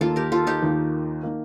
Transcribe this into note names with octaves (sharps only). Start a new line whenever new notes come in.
D#2 D#3 A#3 F4 A4
G4 A#4
F4 A4
D#4 G4
D#2 D#3 A#3
D#3 A#3